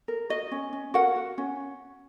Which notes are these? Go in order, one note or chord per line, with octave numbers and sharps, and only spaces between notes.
A#4
F#4 D#5
C#4
C#4
F#4 A#4 F#5
F#4
C#4